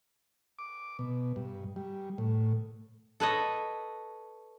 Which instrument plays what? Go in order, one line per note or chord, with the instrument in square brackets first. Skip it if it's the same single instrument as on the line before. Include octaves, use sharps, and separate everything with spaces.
[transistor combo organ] D6
B2
G2
G3
A2
[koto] A4 B4 C#5 D#5